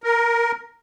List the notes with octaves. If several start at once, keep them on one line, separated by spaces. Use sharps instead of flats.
A#4